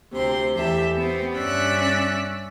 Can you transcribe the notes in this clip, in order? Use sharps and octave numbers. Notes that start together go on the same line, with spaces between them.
D2 C3 C4 C6
E2 E3 G4 A4 E5
B3 C4 G4
G2 C#4 D5 E5 E6 F#6